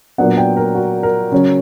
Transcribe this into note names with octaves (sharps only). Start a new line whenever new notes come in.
A#2 F#3 B3 D4 F#5
G5
A#4
F#4
A#4
C#3 F#3 C#4